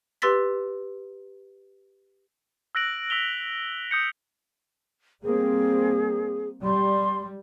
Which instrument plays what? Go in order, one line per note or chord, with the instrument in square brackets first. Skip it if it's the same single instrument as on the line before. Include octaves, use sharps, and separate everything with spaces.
[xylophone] G4 B4 C6 E6 A6 B6
[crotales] E6 F#6 A#6 D7 F#7
E6 B6 F7 G7
D#6 G6 C#7
[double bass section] G3 A#3 C4 [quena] G#4
[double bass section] G3 [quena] C6